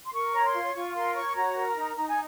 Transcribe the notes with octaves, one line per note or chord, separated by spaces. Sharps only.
C6
A#4 C#6
C#5 A#5
C6
F4
F4 C#6
A#4 C6
C#5 C#6
F#4 A#5
A#4
D#4
D#4 A#5
G#5